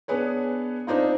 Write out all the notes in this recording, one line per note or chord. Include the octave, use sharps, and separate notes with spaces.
B3 D4 G#4 B4 C#5
C4 D4 D#4 F4